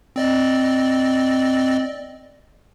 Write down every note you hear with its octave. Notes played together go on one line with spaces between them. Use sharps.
C4 D5 D#5